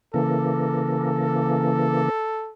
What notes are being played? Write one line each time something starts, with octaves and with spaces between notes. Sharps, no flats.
C#3 E3 A#3 A4